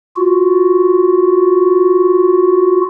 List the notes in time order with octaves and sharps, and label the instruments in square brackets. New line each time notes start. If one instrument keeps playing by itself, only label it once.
[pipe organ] F4 F#4